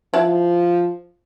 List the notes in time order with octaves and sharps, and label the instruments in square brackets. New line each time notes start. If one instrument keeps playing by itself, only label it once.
[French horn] F3 [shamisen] E4 F#5 A5